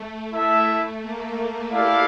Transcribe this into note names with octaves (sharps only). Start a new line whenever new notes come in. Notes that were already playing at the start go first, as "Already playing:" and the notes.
Already playing: A3
E4 A4 E5
A#3
E4 G4 A4 D5 F5